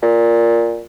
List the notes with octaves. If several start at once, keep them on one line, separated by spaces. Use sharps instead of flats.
A#2